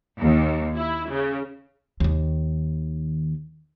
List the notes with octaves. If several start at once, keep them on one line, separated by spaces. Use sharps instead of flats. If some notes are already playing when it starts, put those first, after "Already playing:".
D#2
E4
C#3
D#2 D#3